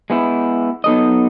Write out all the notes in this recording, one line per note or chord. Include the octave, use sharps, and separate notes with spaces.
G#3 B3 E4
F#3 B3 D#4 A4 D#5